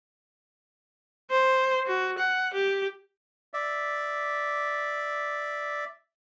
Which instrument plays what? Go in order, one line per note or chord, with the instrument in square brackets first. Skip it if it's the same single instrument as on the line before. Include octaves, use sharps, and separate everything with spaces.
[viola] C5
F#4
F#5
G4
[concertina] D5 E5